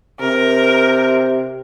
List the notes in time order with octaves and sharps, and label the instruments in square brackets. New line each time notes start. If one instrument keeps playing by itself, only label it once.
[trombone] C3 [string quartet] A#4